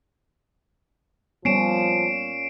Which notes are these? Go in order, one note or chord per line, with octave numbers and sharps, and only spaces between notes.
A#2 F3 G3 B3 C#4 C7 D7 E7